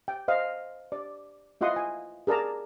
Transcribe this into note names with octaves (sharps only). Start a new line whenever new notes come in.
G5
C5 D#5 F5
D5
E4 F4 D#5 F#5 C6 D#6
G#5
G#4 A#4 D5 A5 A#5